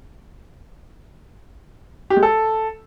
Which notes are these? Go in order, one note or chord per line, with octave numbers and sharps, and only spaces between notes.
G4
G#3
A4